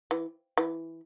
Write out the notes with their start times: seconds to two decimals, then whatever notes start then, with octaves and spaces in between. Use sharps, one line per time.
0.11 E3
0.57 E3